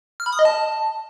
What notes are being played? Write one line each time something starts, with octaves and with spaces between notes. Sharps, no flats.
F6
B5
D#6
D#5
A5